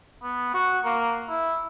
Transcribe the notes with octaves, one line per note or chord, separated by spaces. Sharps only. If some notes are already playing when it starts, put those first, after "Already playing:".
B3
F#4
A#3
E4